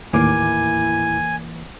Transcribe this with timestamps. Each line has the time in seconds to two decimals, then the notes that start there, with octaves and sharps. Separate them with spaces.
0.13 D#2 A2 E3 A#3 E4 G#5 D6